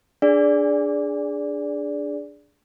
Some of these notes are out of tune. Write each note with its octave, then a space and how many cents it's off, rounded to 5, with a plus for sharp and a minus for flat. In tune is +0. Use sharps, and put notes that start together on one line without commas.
D4 +0 G#4 +0 D5 -10